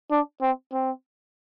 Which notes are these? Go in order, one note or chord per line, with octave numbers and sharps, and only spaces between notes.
D4
C4
C4